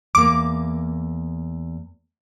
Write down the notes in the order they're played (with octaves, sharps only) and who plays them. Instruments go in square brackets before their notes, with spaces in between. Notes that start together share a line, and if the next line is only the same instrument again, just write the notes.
[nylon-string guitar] E2 A#3 [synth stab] D6